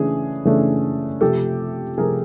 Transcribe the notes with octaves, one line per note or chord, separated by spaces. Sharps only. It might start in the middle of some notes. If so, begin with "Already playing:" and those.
Already playing: C#3 E3 A3 D4 G#4
C#3 E3 A3 D4
C3 F3 A3 G4 A4
C3 F3 A3 G#4 A#4